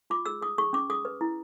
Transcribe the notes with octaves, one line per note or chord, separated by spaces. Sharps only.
F4 D6
G#4 E6
G#4 D#6
G#4 C#6
C#4 D6
G#4 D#6
B4
E4